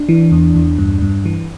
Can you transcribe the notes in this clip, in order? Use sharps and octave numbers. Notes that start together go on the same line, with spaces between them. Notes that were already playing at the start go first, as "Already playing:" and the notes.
Already playing: D4
E3
E2
E2
G2
G2
E3